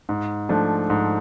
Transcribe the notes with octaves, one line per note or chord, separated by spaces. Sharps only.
G#2
F3 A3 D4
G#2